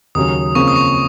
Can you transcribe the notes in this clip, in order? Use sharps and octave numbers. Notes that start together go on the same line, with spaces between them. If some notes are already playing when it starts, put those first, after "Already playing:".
D#2 C#3 F#3 C#4 D#6
F2 C#3 F3 A#3 C#4 C#6
D#6
C#6